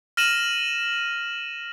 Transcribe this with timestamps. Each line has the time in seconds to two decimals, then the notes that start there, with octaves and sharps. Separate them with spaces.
0.17 F6 A#6 D#7 E7 F#7